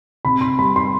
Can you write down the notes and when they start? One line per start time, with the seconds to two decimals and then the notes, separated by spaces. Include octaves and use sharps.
0.25 C3 B5
0.41 C6
0.59 G3 B5
0.76 C6